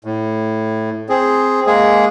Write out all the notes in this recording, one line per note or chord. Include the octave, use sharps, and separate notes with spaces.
A2
C4 G#4
G#3 A#3 G#4